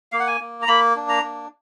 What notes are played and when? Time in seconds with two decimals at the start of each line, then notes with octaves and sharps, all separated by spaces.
0.12 A#3 F5
0.20 F#5
0.27 G#5
0.41 A#3
0.62 A#5
0.68 A#3 B5
0.96 D4
1.09 A#5
1.23 A#3